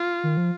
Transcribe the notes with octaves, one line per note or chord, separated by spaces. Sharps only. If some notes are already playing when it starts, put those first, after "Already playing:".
Already playing: F4
D#3
F3